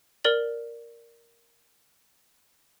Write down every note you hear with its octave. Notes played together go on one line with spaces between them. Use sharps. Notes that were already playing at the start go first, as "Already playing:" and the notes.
A#4 D5 F#7